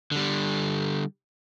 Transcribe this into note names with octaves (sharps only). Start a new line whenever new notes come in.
D3 G3